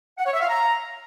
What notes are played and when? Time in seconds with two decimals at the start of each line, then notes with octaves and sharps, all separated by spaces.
0.18 F#5
0.26 C#5
0.33 E5
0.41 F5
0.49 A#5